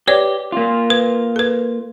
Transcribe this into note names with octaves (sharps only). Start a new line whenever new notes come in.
G4 B4 C#5 D5
A#3 F4
B4
A4 B4